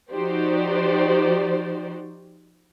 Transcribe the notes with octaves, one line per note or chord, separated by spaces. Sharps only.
F3 D#4 F#4 G4 C5 D5